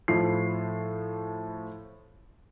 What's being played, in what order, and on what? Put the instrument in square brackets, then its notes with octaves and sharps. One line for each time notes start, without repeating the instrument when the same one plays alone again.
[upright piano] A2 F3 C7